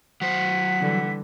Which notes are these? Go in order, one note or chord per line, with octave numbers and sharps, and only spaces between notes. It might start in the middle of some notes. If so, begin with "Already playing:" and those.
F#3 C5 F#5 B6
D3 E3 G3